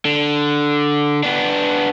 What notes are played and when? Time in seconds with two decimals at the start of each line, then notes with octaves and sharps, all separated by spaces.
0.05 D3
1.23 B3 D4